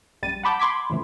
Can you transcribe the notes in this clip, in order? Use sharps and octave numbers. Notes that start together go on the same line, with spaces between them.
A#1 F#2 G3 A6 D#7
F#5 A5 B5 D6 G6
B5 C6 D6 G#6 B6
F2 A2 C#3 E3 F3 A3